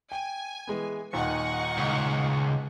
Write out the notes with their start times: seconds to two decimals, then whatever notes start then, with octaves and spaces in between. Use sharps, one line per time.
0.12 G5 G#5
0.67 E3 G#3 B3
1.13 D#1 D#2 A#2 D#4 F#5 C#6
1.78 C#2